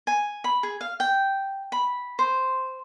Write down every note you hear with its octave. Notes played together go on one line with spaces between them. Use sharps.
G#5
B5
G#4
F5
G5
B5
C5